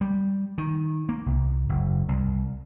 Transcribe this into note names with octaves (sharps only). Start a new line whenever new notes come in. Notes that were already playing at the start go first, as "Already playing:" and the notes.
G3
D#3
A#3
C2
F#1
C2